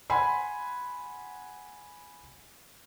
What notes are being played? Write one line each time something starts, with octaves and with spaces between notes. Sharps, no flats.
F#5 G#5 B5 C6